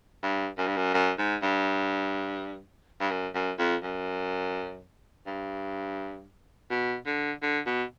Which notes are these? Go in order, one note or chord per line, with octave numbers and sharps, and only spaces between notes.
G2
F#2
G2
F#2
F#2
G#2
G2
G2
F#2
F#2
F2
F#2
G2
B2
D3
D3
B2